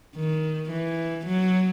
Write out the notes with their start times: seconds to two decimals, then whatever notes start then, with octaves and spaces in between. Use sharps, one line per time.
0.16 D#3
0.70 E3
1.26 F#3